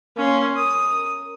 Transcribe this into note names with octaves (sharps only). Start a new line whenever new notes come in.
A#3 C#4 C6
A#4 D#6